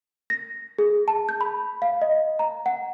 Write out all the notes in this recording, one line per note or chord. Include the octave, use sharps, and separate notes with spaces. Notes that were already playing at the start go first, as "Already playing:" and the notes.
A#6
G#4
A5
G6
B5
F5
D#5
A#5
F#5